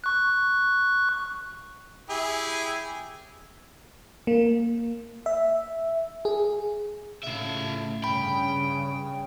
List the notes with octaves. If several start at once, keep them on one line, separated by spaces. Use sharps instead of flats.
C#6 F#6
E4 G4 G#4
A#3
E5
G#4
A2 C#3 A3 F4 E5
G2 C#3 G5 B5